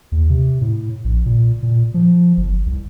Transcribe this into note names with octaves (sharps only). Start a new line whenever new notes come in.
D#2
C3
A2
A#1
A#2
A#2
F3
G1
C2